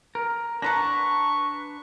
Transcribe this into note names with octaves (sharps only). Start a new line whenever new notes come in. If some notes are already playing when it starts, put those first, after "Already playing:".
A#4
D4 B4 F#5 A5 A#5 C#6 A#6